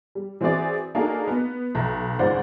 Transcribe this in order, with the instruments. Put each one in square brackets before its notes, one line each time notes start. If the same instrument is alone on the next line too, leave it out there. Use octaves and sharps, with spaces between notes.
[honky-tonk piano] G3
E3 C4 E4 F#4 G#4 D5
A#3 D4 D#4 F#4 G#4 A4
B3
B1
G#1 C#2 D#3 C5 D5 F#5